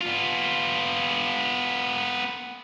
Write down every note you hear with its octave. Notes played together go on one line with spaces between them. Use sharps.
B3 F4